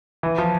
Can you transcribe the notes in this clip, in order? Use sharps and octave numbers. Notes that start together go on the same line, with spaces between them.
E3
F3